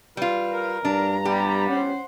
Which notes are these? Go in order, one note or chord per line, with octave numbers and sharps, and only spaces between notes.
G3 F4 B4
A#4
G2 D4 A#5
G3 B3 G4
C#4 C5 F#5